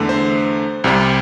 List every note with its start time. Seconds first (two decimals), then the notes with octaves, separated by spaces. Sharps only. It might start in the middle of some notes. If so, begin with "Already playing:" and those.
Already playing: E2 D3 A3
0.09 C5
0.84 C2 C3 G3